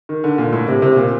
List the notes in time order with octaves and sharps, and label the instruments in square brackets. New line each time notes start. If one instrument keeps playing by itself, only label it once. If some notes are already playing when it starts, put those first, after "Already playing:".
[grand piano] D#3
D3
A#2
A2
C3
C3
A#2